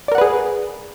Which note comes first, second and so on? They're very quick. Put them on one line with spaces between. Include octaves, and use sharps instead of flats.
D5 A#4 F#5 B4 G#4